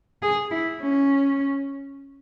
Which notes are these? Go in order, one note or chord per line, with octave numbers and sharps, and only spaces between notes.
G#4
E4
C#4